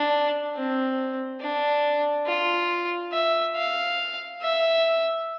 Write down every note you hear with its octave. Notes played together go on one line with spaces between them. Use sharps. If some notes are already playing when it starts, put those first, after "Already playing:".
Already playing: D4
C4
D4
F4
E5
F5
E5